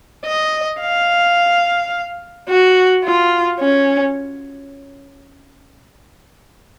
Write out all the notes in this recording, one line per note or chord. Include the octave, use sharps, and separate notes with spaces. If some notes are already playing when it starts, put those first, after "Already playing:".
D#5
F5
F#4
F4
C#4